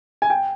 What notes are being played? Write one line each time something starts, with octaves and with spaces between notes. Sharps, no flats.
G#5
G5